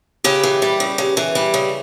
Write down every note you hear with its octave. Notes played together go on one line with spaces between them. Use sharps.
C#3 G4 B4
E3
G3
C#3
C#3
E3
G3
C#3